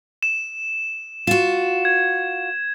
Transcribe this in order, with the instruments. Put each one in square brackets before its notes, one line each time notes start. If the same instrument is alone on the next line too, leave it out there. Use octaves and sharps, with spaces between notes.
[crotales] E7
[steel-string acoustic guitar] F4 F#4 [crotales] E7
[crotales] G#6